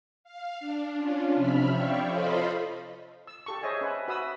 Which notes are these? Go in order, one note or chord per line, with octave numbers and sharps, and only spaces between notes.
F5
D4
C#4 D4 F4
C3 F3 E5 B5 F6
C#5 D5 E5 F5 G5 C#6
F4 A4 C5 D#5 F5 B5
E6
G4 A4 C#6
G#4 C5 C#5 D#5 E5 G#5
C#4 B4 E5
F#4 B4 E5 D#6 E6